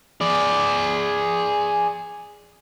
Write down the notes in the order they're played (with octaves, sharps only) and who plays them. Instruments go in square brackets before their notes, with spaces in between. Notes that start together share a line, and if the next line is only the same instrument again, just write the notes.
[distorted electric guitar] G#4 D5